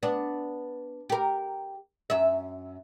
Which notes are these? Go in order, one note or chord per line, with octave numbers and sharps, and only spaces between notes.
B3 D4
G4 A#4
F#2 E5